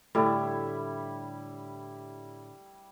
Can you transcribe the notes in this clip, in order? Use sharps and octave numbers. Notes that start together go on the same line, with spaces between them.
A2 D3 G3 E4